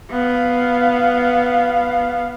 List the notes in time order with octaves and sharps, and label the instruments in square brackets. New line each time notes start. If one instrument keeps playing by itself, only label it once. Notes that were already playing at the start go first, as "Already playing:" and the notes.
[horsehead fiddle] B3 F5